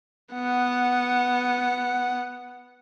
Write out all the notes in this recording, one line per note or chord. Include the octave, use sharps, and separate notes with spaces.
B3 F#5